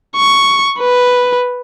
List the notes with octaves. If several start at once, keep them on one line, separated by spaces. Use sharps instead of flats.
C#6
B4